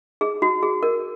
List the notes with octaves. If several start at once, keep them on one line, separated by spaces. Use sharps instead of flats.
G#4
F#4
G#4
A#4